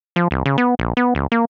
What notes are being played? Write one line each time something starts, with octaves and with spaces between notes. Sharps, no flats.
F3
C2
C#3
B3
A#1
B3
C#2
A#3